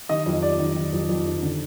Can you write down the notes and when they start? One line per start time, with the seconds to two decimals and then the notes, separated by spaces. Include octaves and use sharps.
0.09 D#3 D#5
0.26 F2
0.42 F2 D5
0.59 D#3
0.76 D#3
0.93 F2
1.09 F2
1.26 D#3
1.43 D3